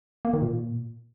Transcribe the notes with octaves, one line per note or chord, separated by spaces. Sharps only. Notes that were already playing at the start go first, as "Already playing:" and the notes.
A#3
D#3
A#2